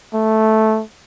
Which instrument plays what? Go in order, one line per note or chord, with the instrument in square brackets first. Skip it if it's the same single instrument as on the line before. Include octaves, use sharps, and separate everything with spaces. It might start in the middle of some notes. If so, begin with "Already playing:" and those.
[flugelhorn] A3